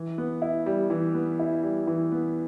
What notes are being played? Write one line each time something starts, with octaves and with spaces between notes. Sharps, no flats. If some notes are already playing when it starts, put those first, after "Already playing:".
Already playing: E3
B3
E4
G3
E3
B3
E4
G3
E3
B3